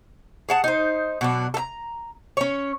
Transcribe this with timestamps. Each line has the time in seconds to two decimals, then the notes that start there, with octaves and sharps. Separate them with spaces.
0.49 G#4 F#5 A5
0.64 D#4 C5
1.21 B2 F#3 D4
1.54 A4 A#5
2.37 C#4 C#5